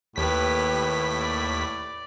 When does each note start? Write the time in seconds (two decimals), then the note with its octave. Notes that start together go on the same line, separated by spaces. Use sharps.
0.16 D#2 A2 G4 B4 B6
1.19 D5